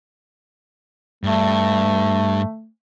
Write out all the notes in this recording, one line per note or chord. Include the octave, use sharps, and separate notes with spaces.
G2 A3